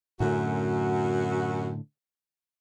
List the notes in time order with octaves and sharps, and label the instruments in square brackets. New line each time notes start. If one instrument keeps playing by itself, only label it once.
[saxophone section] F#2 F#4 [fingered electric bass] A2 D3 A3